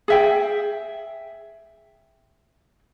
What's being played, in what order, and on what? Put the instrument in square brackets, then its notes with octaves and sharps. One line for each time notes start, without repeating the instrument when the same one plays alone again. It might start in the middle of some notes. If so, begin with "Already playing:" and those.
[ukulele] G#4 E5 G5